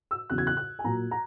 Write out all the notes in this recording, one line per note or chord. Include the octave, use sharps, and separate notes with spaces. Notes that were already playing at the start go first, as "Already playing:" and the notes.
E6
E2 C#3 F#3 F#6
G#6
F#6
F#6
G#5
A#2 F#3 A#5
A#5